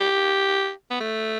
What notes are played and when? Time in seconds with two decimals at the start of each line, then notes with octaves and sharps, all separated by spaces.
0.01 G4
0.91 B3
1.01 A3